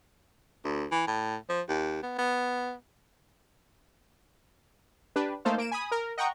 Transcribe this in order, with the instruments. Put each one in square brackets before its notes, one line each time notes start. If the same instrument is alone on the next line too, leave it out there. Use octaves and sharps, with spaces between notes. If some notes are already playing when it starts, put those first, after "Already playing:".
[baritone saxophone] D2
E3
A2
F3
D#2
B3
B3
[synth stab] D4 G4 B4
A3 A#3 D#4 A4 C5 F5
A#3 D7 E7
G#5 B5 D#6
A#4
D#5 F#5 G5 A#5 C#6